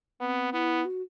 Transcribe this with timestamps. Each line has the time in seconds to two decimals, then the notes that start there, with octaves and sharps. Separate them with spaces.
0.20 B3 C4
0.53 B3 E4
0.85 F#4